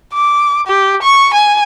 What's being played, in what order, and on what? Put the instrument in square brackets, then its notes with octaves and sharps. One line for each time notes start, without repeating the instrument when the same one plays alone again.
[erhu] D6
G4
C#6
G#5